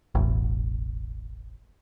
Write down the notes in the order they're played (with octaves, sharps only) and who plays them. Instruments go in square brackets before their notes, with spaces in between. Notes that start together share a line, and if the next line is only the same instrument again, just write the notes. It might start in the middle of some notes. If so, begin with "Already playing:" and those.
[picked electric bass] E1 A1